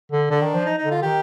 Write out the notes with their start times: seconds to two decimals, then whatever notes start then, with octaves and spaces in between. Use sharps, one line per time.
0.12 D3
0.30 D3 D4
0.41 D#3
0.54 F3
0.66 D#4
0.79 D#4
0.84 D3
0.91 F4
1.03 D#3 G4